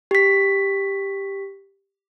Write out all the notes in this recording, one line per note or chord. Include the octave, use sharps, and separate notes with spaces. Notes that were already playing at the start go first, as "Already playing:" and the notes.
G4 B6